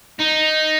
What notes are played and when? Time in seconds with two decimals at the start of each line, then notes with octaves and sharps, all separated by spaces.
0.19 D#4